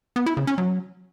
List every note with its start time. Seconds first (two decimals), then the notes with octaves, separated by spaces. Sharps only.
0.16 B3
0.26 E4
0.37 C#3
0.47 C#4
0.58 F#3